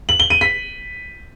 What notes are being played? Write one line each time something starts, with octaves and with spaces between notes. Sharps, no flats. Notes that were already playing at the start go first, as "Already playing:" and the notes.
F#7
G7
D#7
B6